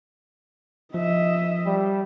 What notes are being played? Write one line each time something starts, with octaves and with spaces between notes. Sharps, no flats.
F3 D#5 E5
G3